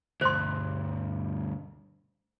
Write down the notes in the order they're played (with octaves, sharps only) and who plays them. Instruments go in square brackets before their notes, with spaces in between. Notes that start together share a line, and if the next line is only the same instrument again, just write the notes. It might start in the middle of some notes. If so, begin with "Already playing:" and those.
[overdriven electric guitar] D2 G2 [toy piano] C5 C6